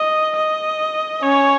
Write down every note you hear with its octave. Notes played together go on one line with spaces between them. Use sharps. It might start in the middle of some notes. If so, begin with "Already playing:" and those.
Already playing: D#5
D#5
C#4 C#5